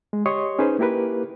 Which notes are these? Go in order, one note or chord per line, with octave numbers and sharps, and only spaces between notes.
G#3
G4 C#5 D#5 C6 C#6 D#6
C#4 D#4 G#4 B4 C5
A#3 E4 G4 A#4 B4